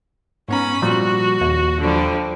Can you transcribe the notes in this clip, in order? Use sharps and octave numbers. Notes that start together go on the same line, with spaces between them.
G#2 B3 C#4 A#5 B5
A#2 F3 G3 F#4
D#2
D3 F3 G3